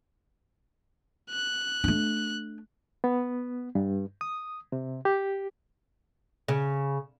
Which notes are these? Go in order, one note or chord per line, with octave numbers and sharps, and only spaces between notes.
F#6
A3 D4
B3
G2
D#6
C3
G4
C#3